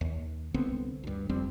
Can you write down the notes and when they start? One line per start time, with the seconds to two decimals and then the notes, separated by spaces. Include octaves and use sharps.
0.01 D#2
0.54 C2 D3 B3 C4
1.04 D2 G2
1.29 F1 F2 G3 C4